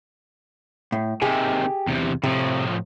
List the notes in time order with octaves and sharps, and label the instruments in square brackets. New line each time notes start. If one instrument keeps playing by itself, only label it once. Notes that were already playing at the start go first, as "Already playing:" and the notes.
[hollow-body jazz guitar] A2
[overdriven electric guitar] C3 D#3 [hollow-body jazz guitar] G4 G#4
[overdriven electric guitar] E2 C3
[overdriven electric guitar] A2 F3 [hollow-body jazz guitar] C3